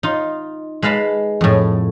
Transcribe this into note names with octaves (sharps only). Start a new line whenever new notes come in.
D#4 F4
G#3 B4 F5 A5 B5
F2 A2